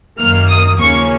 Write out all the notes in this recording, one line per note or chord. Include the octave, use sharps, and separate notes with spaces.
F#2 D#3 A#3 F6
D#6
D#2 C#3 F3 A#3 C#4 C#6